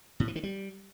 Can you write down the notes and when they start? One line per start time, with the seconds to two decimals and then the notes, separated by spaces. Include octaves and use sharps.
0.20 A2
0.28 E3
0.36 D#3
0.43 G3